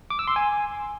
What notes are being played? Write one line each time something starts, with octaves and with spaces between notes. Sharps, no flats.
D6
E6
C6
G#5